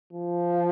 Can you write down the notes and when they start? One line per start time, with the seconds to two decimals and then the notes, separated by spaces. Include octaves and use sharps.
0.13 F3